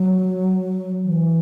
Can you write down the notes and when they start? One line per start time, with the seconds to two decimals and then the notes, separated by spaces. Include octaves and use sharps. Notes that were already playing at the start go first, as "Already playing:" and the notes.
Already playing: F#3
1.04 E3